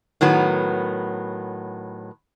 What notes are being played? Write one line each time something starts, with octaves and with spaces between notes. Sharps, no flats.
A2 D#3 F#3 B3